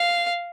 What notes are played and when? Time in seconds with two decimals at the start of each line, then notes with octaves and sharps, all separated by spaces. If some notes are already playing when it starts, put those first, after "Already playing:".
Already playing: F5